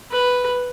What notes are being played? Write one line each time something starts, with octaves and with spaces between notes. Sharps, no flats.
B4